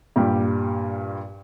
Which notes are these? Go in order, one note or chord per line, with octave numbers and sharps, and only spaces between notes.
G2 A#2 G3 G4